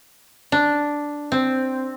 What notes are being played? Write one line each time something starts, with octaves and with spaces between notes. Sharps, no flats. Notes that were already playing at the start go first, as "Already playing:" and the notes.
D4
C4